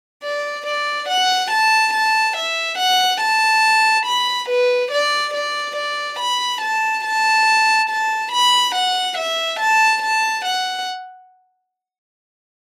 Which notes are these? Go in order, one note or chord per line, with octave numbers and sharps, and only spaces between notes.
D5
D5
F#5
A5
A5
E5
F#5
A5
B5
B4
D5
D5
D5
B5
A5
A5
A5
B5
F#5
E5
A5
A5
F#5